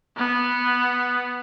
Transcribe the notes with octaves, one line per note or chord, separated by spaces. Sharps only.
B3